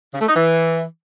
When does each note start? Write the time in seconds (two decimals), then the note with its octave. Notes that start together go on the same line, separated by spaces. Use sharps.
0.14 C#3
0.21 A3
0.29 D#4
0.36 E3